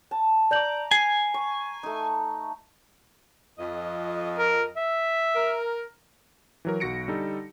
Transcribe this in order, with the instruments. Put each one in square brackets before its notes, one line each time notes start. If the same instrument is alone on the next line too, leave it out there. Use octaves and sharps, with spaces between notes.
[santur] A5
[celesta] D5 G6 F#7 [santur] A#5 D6
[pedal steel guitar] G#5 [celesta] C7
[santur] C#6
A3 D#4
[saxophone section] F2 D#5
[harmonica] A#4
E5
[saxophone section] A#4
[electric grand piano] E3 F#3 A#4
B1 F#4 A#6 C#7 D7
D3 G3 D#4 A4